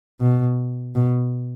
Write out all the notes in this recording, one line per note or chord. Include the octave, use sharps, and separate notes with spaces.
B2
B2